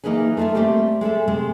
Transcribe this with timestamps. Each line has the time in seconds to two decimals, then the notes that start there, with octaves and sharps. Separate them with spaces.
0.04 E3 A#3 D#4 G#4 B4 G#5
0.37 A3 F4 A4 E5 G#5
0.55 G3 A3 A#3 C4 G4
1.01 G#3 G#4 A4 E5
1.28 C3 G#3 A3